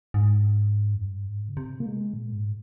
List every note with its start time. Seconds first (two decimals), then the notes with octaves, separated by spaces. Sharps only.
0.14 G#2
0.95 F2
1.01 G2
1.28 G#2
1.48 C#3
1.57 C3
1.80 A#3
1.86 G#3
2.14 A#2
2.32 G#2